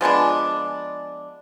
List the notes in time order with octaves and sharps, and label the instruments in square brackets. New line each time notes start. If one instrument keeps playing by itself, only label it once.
[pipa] F3 G#3 B3 D4